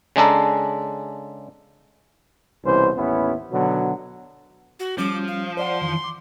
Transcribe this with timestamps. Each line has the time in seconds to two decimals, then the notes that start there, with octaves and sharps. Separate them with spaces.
0.16 C#3 G#3 D4 A4 A#5
2.65 C2 B2 E3 C#4 C5
2.96 A1 D#2 B3 C#4 E4
3.52 B2 D3 D#3 F#3
4.80 F#4
4.98 F3 G3 C#4 D6
5.28 F5
5.57 C5 D5 F#5 C6
5.82 F2 D#3 E3
6.04 D6